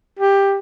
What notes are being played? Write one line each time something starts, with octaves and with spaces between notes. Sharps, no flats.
G4